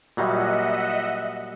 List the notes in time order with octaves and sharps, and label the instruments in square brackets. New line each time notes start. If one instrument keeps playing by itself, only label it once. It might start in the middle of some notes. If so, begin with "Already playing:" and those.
[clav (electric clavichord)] A#2 F#3 G3 [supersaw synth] D#5 E5 F#5